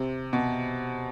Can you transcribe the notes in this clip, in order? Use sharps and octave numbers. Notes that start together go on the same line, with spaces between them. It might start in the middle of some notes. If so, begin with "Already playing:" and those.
Already playing: C3
B2